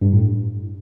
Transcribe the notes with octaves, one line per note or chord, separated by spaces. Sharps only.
G2
A2